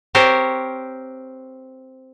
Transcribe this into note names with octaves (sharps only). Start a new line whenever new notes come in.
C4 G4 A#4 C5 C#5